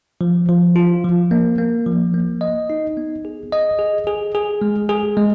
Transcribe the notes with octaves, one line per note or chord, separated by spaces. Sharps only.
F3
F3
F4
F3
A#3
A#3
F3
A#3
D#5
D#4
B3
G#4
D#5
G#4
G#4
G#4
G#3
G#4
G#3